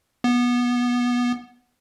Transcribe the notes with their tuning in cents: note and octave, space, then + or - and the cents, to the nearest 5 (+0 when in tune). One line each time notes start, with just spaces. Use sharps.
B3 -20